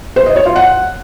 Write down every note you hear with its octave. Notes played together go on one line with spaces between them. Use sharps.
C5
D#5
C#5
F4
F#5